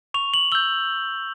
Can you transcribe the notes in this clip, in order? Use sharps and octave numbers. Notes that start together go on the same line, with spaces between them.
C#6 F7
F#7
E6 G6 G7